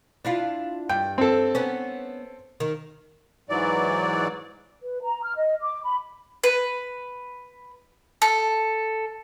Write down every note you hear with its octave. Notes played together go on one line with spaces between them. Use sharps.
D4 E4 F4
G2 G5
C4 A4
B3 C#4
D#3
G#2 E3 F#3 D5
B4
A#5
F6
D#5
D6
B5
B4
A4